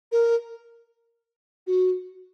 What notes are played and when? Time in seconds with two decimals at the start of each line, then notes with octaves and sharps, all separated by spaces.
0.12 A#4
1.67 F#4